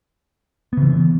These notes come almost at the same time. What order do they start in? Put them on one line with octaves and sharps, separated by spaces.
B3 C#3 E3